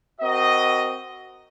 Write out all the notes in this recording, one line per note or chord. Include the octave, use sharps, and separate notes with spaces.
C4 F#4 A#4 D#5